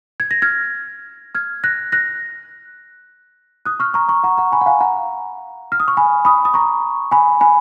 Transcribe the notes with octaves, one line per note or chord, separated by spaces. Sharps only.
G#6
A#6
F6 G#6
F6 G#6
F#6 A#6
F#6 A#6
D#6 F#6
C#6 F6
A#5 C#6
A#5 C#6
F#5 A#5
F#5 A#5
G#5 B5
F#5
F5 G#5
F#5 A#5
F6
D#6
C#6
G#5 B5
B5 D#6
D#6
A#5 C#6
G#5 B5
G#5 B5